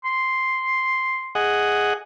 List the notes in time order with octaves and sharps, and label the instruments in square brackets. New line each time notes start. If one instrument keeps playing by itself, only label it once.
[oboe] C6
[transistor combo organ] G#4 D#5 F#5